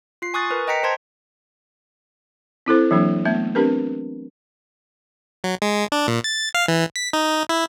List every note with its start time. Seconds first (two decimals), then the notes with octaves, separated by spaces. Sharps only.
0.22 F4 C7
0.34 G#5 C#6 D#6 F#6 A6
0.50 A#4 B4
0.68 D#5 G5 A#5 B6 C#7
0.83 C5 A5 C6 G#6
2.66 C4 E4 A4 C5
2.91 E3 F#3 A#3 D4
3.25 A3 B3 E5
3.55 C4 D4 G4 A#4 B4
5.44 F#3
5.62 G#3
5.92 D4
6.08 A#2
6.24 A6
6.54 F5
6.68 E3
6.96 B6
7.13 D#4
7.49 E4